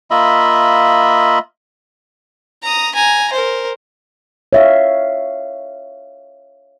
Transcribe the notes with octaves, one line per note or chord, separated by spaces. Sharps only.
A#3 F4 D#5 E5 B5
A#5 D#6
G#5 A#5
A#4 C5
C#5 E5 F5